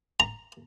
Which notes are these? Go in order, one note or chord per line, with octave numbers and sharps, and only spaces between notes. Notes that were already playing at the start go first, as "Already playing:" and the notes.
A#5